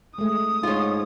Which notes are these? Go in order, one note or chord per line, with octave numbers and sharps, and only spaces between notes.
G#3 A3 D#6
G#2 F4 C#5